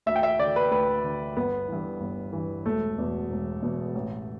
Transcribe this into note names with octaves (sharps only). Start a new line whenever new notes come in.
D2 E5
G5
E5
D3 D5
B4
D2 B4
D3
G1 B3
G2 E3
G1
G2 E3
E1 A3
E2 B2
E1
E2 B2
A1